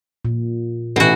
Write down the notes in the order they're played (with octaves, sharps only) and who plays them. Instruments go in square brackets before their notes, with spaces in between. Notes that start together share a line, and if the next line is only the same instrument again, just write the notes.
[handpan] A#2
[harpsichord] A1 E3 [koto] B2 F#4